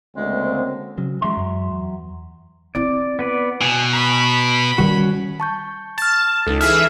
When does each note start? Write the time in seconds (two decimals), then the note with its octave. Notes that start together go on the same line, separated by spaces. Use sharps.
0.16 D2 C#3 G#3 A#3 C4
0.98 C#3 F#3
1.21 E3 F#3 G#3 E5 C6
1.37 F#2
1.71 E2
2.75 C4 E4 D5
3.19 B3 B4 D5
3.61 B2 G#5
3.93 A#5 B5 C#6
4.78 D#3 G3 C#4 F#4
5.40 A5 C#6 G6
5.98 A5 F6 A6
6.47 C#2 D#4 A4
6.61 E3 G#4 E5 F6